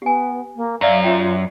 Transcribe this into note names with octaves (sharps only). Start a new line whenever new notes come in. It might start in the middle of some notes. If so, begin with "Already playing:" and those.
B3 G4 G#5
A#3
F#2 A#4 D5 E5 F5
F4 C#5 E5 G5